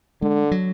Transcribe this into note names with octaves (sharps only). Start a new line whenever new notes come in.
D3 G#3
F#3